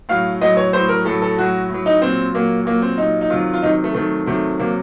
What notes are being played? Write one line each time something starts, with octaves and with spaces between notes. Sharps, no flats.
A2 F#3 F5
A2 F#3 D#5
C#5
A2 F#3 C5
A#4
A2 F#3 A4
A4
A2 F#3 F#4
A2 F#3
D#4
A#2 F#3 C4
A#2 F#3 A#3
A#2 F#3 A#3
C4
A#2 F#3 D#4
D#4
C3 D#3 F#3 F4
F4
C3 D#3 F#3 D#4
A3
C3 D#3 F#3 A3
C3 D#3 F#3 A3
C3 F#3 A#3